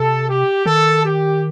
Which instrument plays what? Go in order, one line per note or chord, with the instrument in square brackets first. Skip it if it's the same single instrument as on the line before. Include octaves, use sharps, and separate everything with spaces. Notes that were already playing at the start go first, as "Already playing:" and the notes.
Already playing: [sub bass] C3 [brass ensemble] A4
[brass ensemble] G4
[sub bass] D#3 [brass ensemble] A4
[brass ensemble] G4